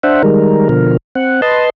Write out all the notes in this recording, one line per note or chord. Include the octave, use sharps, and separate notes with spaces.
D4 C5 E5 F#5
D#3 G3 G#3 A#4
B2 D3 F3 A#4
C4 F#5
B4 D#5 A5 C6